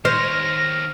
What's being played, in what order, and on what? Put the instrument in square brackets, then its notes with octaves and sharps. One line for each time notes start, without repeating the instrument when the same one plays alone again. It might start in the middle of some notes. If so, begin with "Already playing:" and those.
[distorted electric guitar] D#3 C#5 [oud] C5 [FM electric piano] F6 [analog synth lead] A#6